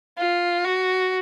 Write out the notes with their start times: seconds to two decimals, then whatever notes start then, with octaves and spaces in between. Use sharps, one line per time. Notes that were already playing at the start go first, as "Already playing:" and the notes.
0.18 F4
0.65 F#4